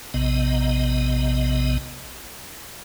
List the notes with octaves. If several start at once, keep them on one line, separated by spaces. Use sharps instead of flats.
A#1 C3 B3 D#5